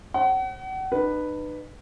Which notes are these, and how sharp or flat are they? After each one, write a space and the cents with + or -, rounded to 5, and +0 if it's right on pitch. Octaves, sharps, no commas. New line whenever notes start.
C5 +40 F#5 +35
D#4 -45 B4 +0